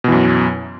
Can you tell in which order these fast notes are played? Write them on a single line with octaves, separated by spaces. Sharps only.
B2 E3 F#2